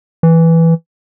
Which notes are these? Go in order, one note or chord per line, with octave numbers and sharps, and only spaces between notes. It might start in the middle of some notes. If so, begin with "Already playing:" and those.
E3